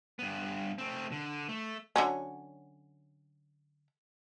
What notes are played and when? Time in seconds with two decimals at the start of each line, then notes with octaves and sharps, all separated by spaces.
0.19 G2 B3
0.78 A3 C4
1.12 D3
1.49 A3
1.96 D3 F#3 C#4